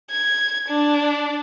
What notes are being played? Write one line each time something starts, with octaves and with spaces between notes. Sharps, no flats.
G#6
D4